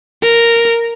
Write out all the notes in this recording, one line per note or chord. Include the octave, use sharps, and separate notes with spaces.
A#4